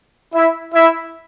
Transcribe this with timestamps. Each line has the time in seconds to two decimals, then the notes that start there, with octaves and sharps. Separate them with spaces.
0.34 E4 E5
0.75 E4 E5